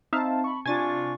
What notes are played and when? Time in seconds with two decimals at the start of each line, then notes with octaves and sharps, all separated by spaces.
0.13 C4 D#4 C5 E5 F5 A5
0.44 B5 C#6
0.66 C3 D4 F4 G#5 C#6 A6